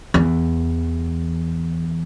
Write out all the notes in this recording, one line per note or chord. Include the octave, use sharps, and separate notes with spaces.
E2